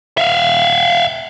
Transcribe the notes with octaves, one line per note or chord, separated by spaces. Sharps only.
E5 F5